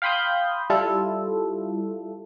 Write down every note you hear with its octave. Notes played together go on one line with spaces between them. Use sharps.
F5 G5 B5 C6 D#6 G6
G3 E4 F4 A4